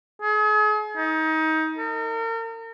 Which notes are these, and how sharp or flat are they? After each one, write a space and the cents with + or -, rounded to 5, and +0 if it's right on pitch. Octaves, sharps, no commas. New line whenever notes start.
G#4 +40
D#4 +25
A#4 -40